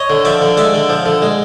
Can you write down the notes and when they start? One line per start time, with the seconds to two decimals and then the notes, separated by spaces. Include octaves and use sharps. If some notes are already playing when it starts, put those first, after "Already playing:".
Already playing: C#5 D#5
0.10 D3
0.25 F3 D5 E5
0.41 D3
0.57 G#3 D5 E5
0.74 D3
0.89 F3
1.06 D3
1.22 G#3